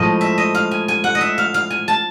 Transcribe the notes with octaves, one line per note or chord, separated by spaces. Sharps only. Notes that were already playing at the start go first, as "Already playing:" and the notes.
Already playing: A2 F3 G#3 D#5
E5
D#5
F5
G#5
G#5
F#5
D#5
E5
F5
F5
G#5
A5